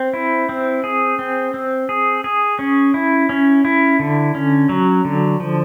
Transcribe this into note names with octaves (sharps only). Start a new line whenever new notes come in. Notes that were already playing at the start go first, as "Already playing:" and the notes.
Already playing: C4
E4
C4
G#4
C4
C4
G#4
G#4
C#4
E4
C#4
E4
D3
C#4
F#3
D3
F3